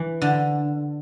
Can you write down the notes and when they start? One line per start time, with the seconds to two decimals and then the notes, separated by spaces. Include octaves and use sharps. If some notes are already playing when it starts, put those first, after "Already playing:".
Already playing: E3
0.22 D3